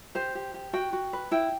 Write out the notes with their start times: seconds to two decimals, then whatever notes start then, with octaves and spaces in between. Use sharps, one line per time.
0.15 G4 C5
0.35 G4
0.54 G4
0.73 F#4 G5
0.93 F#4
1.13 B4
1.31 E4 G5